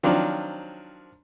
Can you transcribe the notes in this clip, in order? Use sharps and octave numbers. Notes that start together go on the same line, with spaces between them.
D#3 F3 F#3 C4 D4 F4